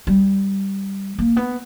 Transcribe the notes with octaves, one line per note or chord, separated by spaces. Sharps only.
G3
A#3
B3